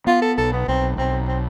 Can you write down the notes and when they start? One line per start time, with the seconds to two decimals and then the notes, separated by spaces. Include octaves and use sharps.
0.07 B3 F4
0.22 A4
0.38 B1 A4
0.53 B3
0.68 B1 C4
0.98 B1 C4
1.28 C4